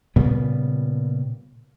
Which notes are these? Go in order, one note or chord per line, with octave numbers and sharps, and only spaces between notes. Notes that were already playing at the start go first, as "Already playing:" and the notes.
A#2 C#3 G3 B3